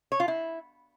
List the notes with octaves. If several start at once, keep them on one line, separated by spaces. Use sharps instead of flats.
C#5
F4
E4